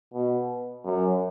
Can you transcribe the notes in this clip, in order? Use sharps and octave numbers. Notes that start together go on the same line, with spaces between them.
B2
F#2